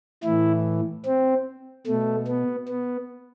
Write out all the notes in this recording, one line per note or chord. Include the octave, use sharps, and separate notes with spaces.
A2 E3 E4
C4
B2 A3
B3
B3